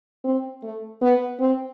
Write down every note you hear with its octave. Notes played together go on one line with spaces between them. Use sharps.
C4
A3
B3
C4